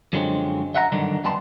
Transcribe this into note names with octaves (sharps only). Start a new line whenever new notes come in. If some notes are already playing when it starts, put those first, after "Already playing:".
F#2 D3 F3 F#3 G#3 C4
D#5 E5 F#5 G5 A#5
G2 D3 D#3 F#3 D4 D#4
F2 G3 B3 A5 C6